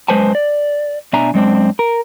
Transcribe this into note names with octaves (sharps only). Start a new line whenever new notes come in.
F#2 G#3 B4 C5 G#5 A5
D5
B2 D4 E5 G#5 A#5
F#2 G#3 C4 D4
A#4